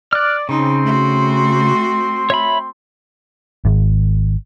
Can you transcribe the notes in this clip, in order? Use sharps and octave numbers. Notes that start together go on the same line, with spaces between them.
D5 F6 F#6
C#3 C4 D#4 C6
A3 F#4
C#5 E5 B5
G#1